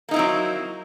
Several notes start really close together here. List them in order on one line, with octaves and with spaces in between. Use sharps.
A#3 D#4 E4 C4 F#3